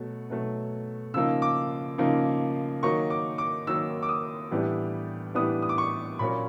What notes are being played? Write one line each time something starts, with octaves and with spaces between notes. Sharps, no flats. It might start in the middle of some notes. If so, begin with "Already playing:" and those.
Already playing: B2 F#3 A3
B2 F#3 A3
C#3 F3 A#3 D#4 E6
D6
C#3 F3 A#3 D#4
D#3 F#3 A#3 D#4 C#6
D6
D6
D#3 F#3 A#3 D#4 E6
D6
D#6
A2 E3 G3 B3 D4
A2 E3 G3 B3 D4 D#6
D#6
D6
C#6
A#2 F#3 A#3 C#4 B5